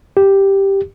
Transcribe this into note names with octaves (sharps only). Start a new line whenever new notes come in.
G4